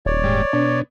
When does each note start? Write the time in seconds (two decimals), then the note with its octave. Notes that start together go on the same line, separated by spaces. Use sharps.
0.06 D#1 C#5 D5
0.24 G#2 G3
0.53 B2 D4